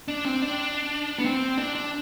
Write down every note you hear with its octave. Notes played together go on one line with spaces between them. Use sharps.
D4
C4
D4
B3
C4
D4
D4